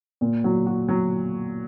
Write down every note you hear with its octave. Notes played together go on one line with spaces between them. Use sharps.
A#2
F#3
F#4
F#3